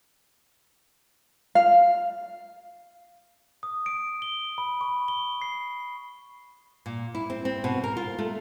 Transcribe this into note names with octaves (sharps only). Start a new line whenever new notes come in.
F5
D#6
D7
G7
B5
C#6
G7
C7
A#2
E4
C4
C4
B2
A#4
F4
A3